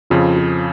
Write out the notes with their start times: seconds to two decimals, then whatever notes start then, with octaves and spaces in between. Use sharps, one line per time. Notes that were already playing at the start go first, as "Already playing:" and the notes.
0.10 F2 C#3 F3 F4
0.36 F4